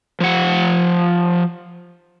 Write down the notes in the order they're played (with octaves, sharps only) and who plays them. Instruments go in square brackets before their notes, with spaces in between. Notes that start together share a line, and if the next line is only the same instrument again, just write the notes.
[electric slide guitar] F3 F#5